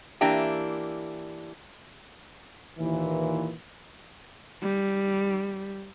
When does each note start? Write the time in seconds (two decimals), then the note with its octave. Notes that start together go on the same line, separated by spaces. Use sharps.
0.21 E3 A#3 D4 E4 G4
2.79 D#2 A#2 E3
4.63 G3